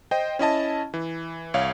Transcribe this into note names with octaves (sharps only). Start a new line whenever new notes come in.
C5 D#5 G5
C#4 E4 D#5 A5
E3
C2 C#5 F5